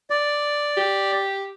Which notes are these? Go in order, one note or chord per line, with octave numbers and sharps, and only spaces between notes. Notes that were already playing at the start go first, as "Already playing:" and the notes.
D5
G4